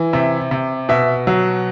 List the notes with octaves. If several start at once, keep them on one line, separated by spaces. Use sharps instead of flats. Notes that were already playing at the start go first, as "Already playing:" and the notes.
Already playing: E3
C3 E5
C3
B2 E5
F#3